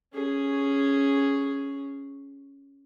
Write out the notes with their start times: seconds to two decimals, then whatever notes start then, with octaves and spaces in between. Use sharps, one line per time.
0.14 C#4 G#4